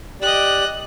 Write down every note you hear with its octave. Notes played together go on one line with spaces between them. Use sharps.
G4 D5 D#5 F#6